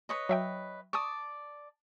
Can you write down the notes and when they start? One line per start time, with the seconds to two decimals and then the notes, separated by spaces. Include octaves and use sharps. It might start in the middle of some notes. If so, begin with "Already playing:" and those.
0.09 B4 C#5 D#5
0.29 F#3 E5 G5
0.93 D5 A5 C#6 D#6